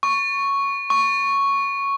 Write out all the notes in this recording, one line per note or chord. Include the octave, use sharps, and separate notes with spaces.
C#6
C#6